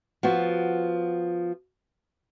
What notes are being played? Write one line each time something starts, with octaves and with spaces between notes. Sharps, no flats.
F3 B3 F4 F#4